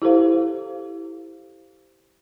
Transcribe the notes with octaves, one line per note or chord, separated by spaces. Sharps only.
E4 G4 A4 C5 F5